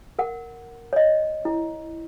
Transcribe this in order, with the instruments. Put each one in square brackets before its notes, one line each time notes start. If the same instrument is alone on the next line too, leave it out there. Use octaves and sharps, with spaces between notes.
[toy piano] A#4 F#5
C#5 D#5
E4